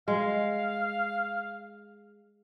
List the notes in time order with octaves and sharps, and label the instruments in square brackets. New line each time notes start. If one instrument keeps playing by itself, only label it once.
[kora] G#3 [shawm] F5